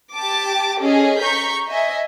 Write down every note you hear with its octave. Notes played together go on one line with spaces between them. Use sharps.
G4 A5 D6
C#4 G#4 A4 D#5
A#5 C#6 G6 B6
D#5 E5 G#5